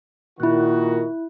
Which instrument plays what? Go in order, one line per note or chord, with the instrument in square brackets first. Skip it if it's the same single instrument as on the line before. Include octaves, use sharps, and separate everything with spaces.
[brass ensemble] A#2 D#3 F#4 [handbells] E4 F#6